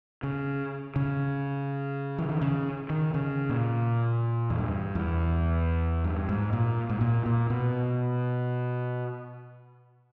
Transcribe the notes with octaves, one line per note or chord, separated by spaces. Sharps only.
C#3
C#3
E3
D#3
C#3
D#3
C#3
A#2
E2
G2
E2
G2
G#2
A#2
G#2
A#2
A#2
B2